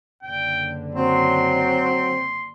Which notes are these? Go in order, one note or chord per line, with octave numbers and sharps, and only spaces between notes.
F#1 D3 G5
F#3 C4 C6